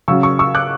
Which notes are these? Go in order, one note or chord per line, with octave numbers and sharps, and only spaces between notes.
C#3 F#3 C#6 E6
C#6 E6
C#6 E6
D6 F#6